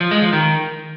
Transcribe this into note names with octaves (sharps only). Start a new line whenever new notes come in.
F3
G#3
F3
D#3